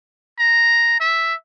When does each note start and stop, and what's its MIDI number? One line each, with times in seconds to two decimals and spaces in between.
0.39 0.97 82
1.00 1.34 76